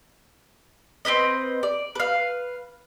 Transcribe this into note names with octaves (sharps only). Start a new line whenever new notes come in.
C4 D#4 B4 D#5
D5
B4 F5